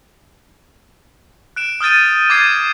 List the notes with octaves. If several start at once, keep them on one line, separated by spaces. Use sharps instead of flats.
F#6 D7 E7
D#6 F6 G6 A6 D#7
D6 G#6 A6 C7 D#7